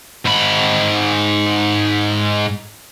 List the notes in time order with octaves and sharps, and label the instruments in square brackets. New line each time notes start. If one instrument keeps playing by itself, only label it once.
[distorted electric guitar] G#2 B5